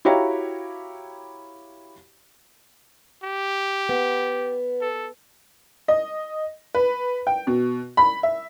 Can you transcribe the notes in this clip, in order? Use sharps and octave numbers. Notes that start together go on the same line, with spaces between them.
E4 F#4 G4 C#5 F5 A#5
G4
B3
A4
D#5
B4
G5
B2
B5
E5